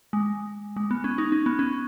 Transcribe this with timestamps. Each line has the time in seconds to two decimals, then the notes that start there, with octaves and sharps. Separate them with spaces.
0.13 G#3
0.76 G#3
0.91 B3
1.04 C#4
1.18 D#4
1.32 C#4
1.46 B3
1.59 C#4